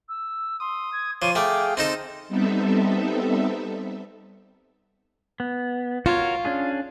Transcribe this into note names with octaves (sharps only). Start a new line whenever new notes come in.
E6
C6 D#6
G#6
F3 C#5 C6 D6 D#7
A3 G#4 F5 G5 D6
C4 D#4 A4 C6
G3 B3 C4 D#4 A4 E5
B3
F4 F#4 A#4 C#5
C#4 D4 G#4